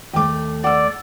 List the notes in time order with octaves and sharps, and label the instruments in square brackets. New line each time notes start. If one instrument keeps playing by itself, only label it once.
[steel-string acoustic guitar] D#2 A3 [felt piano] G5 D6
[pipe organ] D5 [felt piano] F#5 E6